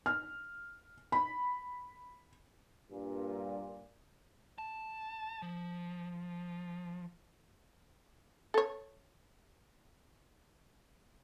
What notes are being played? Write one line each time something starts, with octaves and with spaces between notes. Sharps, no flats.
F6
B5
G2 A#2
A5
F3
A4 C#5